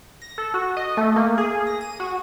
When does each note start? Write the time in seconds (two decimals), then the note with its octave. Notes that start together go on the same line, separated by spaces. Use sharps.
0.22 A#6
0.38 A4
0.54 F#4
0.77 D#5
0.97 A3
1.16 A#3
1.38 G#4
1.67 A#6
1.81 D#7
2.00 F#4